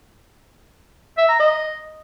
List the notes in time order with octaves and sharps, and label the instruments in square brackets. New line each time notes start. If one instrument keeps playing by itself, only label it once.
[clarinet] E5
A#5
D#5